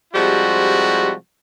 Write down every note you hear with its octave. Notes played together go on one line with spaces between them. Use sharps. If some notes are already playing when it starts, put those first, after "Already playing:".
C3 F3 G3 G#3 E4 F#4